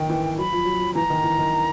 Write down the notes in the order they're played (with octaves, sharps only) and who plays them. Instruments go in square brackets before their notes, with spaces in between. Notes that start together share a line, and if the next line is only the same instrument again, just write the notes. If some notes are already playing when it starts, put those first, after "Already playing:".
Already playing: [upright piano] D#3 [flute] G5
[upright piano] E3
[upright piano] F#3 [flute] B5
[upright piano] F3
F#3
F3
[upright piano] E3 [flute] A#5
[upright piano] D#3
E3
D#3